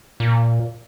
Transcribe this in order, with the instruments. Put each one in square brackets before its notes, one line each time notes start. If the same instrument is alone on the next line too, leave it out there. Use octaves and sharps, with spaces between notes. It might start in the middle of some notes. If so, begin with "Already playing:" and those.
[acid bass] A#2